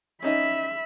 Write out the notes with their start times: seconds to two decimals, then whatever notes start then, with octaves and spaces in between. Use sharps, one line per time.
0.22 C#4 D#4 D#5 E5 B5